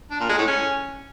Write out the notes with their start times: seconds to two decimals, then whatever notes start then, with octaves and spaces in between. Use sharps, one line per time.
0.11 D4
0.20 A#2
0.29 G#3
0.38 A2
0.48 C#4